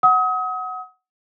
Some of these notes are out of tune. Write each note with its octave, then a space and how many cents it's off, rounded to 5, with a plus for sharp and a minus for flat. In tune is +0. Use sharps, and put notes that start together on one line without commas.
F#5 +0 D#6 +35